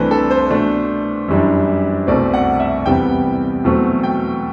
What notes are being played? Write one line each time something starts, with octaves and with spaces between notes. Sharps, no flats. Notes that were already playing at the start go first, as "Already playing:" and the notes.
Already playing: C2 C3 E3 A3 D4 B4 C5
A4
C5
B2 A3 D4
F#2 E3 G3 D4
C2 B2 A3 C4 D5
F#5
E5
E2 C3 G3 B3 G5
E2 B2 F#3 A3 C4
G5